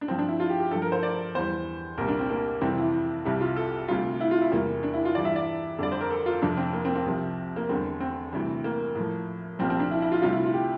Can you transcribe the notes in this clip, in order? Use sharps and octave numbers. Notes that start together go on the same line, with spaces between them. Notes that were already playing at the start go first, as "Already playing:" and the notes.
D4
G2 F3 C4
D4
E4
F4
G4
G4
G2 F3 A4
A#4
C5
D5
E2 E3 G3 C5
C2 A#2 G3 A#4
D4
C4
A#3
F2 C3 E3 G3 C4
E4
C2 C3 G3 E4
F4
A4
D2 C3 G3 F4
E4
F4
E4
E2 C3 G3 A#3
D4
E4
F4
G2 E3 G3 D5
E5
D5
F2 D3 G3 D5
C5
A#4
A4
F4
F2 C3 F3 D4
C4
A#3
C4
C4
C2 C3 F3
A#3
E2 D3 G3 C4
C4
D2 C3 E3 G3
A#3
A2 F3
C2 A#2 F3 C4
C4
D4
E4
E4
F4
D2 C3 G3 F4
E4
F4
G4